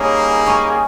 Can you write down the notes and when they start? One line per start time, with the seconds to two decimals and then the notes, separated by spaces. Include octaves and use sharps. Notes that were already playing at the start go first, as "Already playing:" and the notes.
Already playing: G3 A#3 C#4 D#4 G#4 C#5
0.46 C#4 C#5